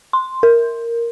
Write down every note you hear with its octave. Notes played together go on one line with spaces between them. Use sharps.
C6
A#4